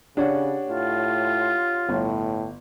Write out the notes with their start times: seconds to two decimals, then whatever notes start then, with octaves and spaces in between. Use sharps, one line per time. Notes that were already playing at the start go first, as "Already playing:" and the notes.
0.17 C#3 D4 G4 C#5 F#5
0.68 A2 F4
1.89 G1 A2